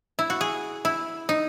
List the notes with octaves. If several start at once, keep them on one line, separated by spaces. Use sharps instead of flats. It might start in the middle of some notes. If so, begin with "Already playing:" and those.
E4
F#4
G#4
E4
D#4